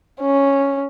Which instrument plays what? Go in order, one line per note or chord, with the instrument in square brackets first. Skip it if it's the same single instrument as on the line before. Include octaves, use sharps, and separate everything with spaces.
[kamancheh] C#4